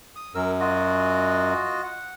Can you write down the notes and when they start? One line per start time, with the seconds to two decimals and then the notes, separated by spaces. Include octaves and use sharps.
0.16 D#6
0.35 F#2 A#4 E6
0.60 F4 F#4 D#5
1.83 F#5